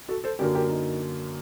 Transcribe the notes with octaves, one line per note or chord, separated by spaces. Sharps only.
F#4 A4
A4 C5
F#2 D3 F#3 A#3 G4 A#4
G4 A#4
D#4